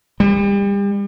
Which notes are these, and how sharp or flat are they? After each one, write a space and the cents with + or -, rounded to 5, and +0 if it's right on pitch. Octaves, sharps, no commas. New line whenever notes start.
G3 +35